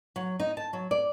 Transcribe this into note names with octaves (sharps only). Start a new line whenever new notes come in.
F#3
D#4
A5
F#3
D5